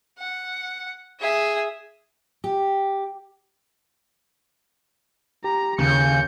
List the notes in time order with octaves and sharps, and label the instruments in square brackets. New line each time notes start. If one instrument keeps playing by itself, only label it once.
[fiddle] F#5
G#4 E5
[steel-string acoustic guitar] G4
[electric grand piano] G4 [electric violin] A#5
[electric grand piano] D#2 [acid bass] C#3 [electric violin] G6 C#7